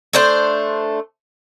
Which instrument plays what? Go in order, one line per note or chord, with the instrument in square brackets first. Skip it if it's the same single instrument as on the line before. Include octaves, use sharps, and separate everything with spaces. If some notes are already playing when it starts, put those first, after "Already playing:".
[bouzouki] A3 D4 C5